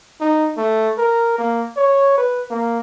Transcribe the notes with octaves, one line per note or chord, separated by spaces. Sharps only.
D#4
A3
A#4
A#3
C#5
B4
A#3